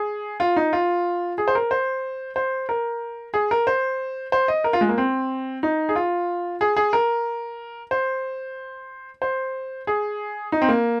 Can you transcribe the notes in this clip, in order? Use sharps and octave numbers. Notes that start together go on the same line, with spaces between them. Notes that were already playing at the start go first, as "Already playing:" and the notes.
Already playing: G#4
F4
D#4
F4
G#4
C5
A#4
C5
C5
A#4
G#4
A#4
C5
C5
D#5
A#4
F4
G#3
A#3
C4
D#4
G#4
F4
G#4
G#4
A#4
C5
C5
G#4
D#4
C4
A#3